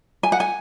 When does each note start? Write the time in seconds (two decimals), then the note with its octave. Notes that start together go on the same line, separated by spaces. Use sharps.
0.23 G#5
0.32 F#5
0.40 G#5